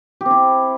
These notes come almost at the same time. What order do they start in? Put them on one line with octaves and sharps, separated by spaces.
G4 C4 E4